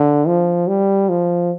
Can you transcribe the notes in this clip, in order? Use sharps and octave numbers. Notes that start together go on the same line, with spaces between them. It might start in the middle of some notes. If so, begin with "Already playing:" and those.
Already playing: D3
F3
G3
F3